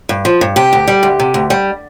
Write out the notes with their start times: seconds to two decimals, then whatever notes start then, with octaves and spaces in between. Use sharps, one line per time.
0.09 G2
0.25 F3
0.41 G2
0.56 C3 G4
0.73 D2
0.88 G3
1.03 D2
1.20 C3
1.34 D2
1.50 G3